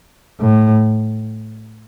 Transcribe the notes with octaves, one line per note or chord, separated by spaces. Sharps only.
A2